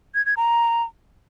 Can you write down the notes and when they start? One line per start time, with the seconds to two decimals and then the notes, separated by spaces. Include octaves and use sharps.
0.15 G#6
0.26 G#6
0.37 A#5